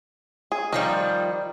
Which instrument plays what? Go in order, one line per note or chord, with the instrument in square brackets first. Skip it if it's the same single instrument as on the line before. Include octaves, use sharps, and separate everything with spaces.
[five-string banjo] G#4
[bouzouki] D#3 F3 G3 [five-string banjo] D#4